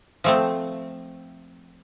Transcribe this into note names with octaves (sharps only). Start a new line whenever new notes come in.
F3 A3 C4